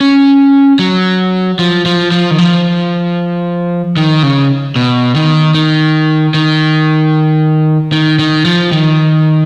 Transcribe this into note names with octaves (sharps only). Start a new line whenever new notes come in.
C#4
F#3
F3
F3
F3
D#3
F3
D#3
C#3
B2
D#3
D#3
D#3
D#3
D#3
F3
D#3